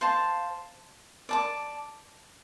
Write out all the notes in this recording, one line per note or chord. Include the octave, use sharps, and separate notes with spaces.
C5 F5 A5
D5 A5 D6